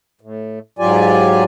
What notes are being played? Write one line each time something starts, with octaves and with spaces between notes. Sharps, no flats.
A2
G#2 F#3 F4 G4 D5 G#5